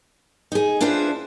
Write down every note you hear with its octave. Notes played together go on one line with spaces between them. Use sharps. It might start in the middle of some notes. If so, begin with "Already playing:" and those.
D#4 G#4
D4 E4 F4 B4 C5